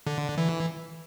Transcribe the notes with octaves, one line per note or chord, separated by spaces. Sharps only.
D3
E3